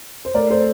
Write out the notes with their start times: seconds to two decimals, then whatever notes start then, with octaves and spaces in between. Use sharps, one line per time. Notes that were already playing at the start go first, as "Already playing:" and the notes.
0.25 C5
0.34 A3 A#4 D5
0.50 A4 C5